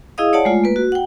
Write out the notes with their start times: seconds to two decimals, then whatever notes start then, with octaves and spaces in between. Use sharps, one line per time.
0.18 E4 G#4 D#5 F5 D#6
0.33 C#5 D5 F#5 A5
0.45 G#3 A3 F4
0.64 A#3 B4
0.76 F#4
0.92 F#5 G5